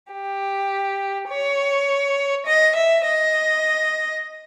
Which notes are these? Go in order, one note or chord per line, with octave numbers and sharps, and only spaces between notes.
G4
C#5
D#5
E5
D#5